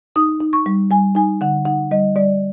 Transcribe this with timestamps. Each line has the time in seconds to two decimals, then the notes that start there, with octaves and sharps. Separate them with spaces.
0.16 D#4 D#6
0.40 D#4
0.53 C#6
0.66 G3
0.91 G3 G#5
1.15 D#4 G#5
1.41 D3 F#5
1.65 D#4 F#5
1.91 G3 D#5
2.16 G3 D5